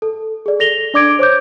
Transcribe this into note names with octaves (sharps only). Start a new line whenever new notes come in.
A4
G#4 D5
A4 A#6 F7 G7
D4 D5 D6 G#6 D7
C5 C#5 D6 G6